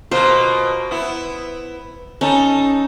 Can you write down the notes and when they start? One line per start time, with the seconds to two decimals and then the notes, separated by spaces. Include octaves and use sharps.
0.11 B2 A#3 F4 C5
0.91 B3 E4
2.21 C#4 D#4 A4